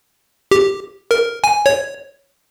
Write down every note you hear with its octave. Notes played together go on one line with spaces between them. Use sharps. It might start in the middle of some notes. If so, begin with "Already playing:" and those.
G4
A#4
G#5
C#5